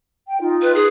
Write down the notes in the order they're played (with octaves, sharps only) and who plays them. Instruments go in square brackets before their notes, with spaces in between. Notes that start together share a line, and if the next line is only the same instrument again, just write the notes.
[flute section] G5
D#4 F4
[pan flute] B4
G#4